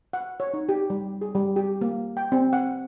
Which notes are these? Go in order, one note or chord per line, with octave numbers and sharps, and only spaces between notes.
F#5
C#5
D#4
G4
G3
G#4
G3
G4
A#3
G5
C4
F#5